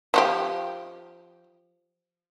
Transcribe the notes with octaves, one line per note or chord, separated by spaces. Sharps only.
F3 F#4 G4